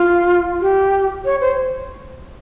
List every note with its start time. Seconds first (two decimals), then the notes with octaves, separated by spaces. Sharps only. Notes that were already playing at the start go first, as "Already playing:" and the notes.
Already playing: F4
0.61 G4
1.25 C#5
1.41 C5